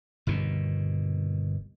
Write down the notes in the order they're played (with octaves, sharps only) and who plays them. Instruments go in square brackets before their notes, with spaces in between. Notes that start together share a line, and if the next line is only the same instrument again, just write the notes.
[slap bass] G1 D#2 B2